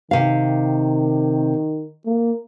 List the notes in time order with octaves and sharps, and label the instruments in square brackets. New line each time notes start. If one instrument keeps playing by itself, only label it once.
[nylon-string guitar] C3 F5 [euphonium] D#3
[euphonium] A#3